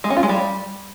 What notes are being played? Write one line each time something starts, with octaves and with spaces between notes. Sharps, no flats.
G#3
C#4
F4
G#3
G3